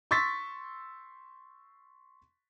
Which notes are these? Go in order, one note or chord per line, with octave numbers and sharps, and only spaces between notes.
C6 C#6 E6 A6 B6